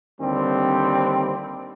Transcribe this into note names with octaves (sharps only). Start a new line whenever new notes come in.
D#2 D3 G3 C4